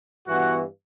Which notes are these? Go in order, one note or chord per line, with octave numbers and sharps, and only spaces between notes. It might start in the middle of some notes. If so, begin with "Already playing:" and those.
G2 E3 B3 F#4